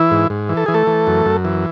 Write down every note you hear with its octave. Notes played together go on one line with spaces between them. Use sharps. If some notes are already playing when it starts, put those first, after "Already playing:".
Already playing: E3 E4
G#2
G#2
E3
A4
E3 G#4
A3 A4
E3
F#2
F#2
E3